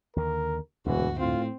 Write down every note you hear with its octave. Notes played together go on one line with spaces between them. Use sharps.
D#2 D3 A#4
E1 D2 G2 A#2 E3 F#4
A2 C4 F4